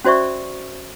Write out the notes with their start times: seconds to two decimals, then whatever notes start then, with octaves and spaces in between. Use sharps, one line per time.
0.04 C#4 F#4 C5 D5 E5 C#6